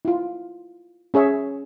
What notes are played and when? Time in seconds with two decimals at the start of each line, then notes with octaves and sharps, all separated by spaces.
0.05 E4 F4
1.14 C#4 G#4 C#5 E5